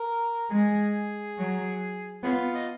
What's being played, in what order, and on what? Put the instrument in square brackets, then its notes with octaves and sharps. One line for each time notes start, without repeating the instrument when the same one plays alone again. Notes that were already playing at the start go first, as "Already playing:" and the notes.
Already playing: [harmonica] A#4
[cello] G#3 [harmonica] G#4
[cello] F#3
[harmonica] G#3 C#4 F4 [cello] B3
[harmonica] D#5